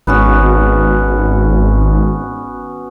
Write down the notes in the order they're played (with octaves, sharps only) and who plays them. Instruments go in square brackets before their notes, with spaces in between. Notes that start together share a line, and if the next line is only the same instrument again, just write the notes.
[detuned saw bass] G#1 [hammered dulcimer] B3 C#4 F#4